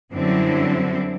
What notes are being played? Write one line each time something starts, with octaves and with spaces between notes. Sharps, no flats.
F#2 D3 F#3 G3 C4 E4